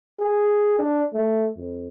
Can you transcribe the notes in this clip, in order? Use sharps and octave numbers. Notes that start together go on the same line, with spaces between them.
G#4
D4
A3
F2